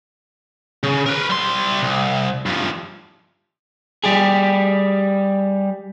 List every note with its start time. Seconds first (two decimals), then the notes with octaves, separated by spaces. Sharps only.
0.83 C#3
1.06 A#4 B4
1.30 G3 C6
1.82 C2
2.46 G2 F3
4.04 G3 G4 G#4